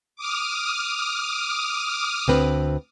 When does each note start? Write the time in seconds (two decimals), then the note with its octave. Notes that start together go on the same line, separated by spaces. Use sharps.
0.16 D6 D#6 F6
2.28 D2 C4 B4